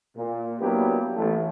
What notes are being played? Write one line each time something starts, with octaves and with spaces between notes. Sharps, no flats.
A#2
F#3 A#3 B3 D4 E4 G4
A1 A3